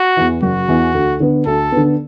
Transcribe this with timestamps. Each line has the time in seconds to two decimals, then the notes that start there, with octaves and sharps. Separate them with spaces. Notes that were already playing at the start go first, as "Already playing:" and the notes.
Already playing: F#4
0.17 E2 E3
0.42 F#1 F#4
0.68 E2 E3
0.95 D2
1.20 D3 B3
1.46 D2 A4
1.72 D3 B3